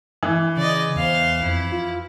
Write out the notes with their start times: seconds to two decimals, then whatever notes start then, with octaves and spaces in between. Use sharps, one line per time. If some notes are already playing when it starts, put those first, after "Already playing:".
0.23 E3
0.57 C#3 D5 D#5
0.96 E2 C5 F5
1.42 F2 E4
1.72 F4